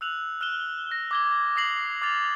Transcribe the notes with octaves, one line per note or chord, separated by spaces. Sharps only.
E6 F#6 F7 F#7
F6 F#6 E7 G7
F6 A#6
D6 G#6 G7
D#6 A#6 C7 F#7
D6 F6 A6 F7